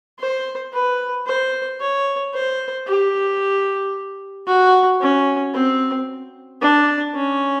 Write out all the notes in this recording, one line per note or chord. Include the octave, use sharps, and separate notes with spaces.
C5
B4
C5
C#5
C5
G4
F#4
C#4
C4
D4
C#4